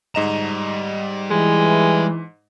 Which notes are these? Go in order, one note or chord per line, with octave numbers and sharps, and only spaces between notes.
G#2 G3 D#5 A#5 E7
E3 G#3